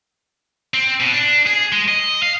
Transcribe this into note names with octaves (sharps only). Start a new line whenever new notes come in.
C4
B2
D4
G#4
G#3
D#5
F5